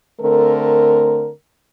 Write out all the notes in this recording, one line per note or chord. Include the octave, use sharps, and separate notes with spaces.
D3 A3 C4 A#4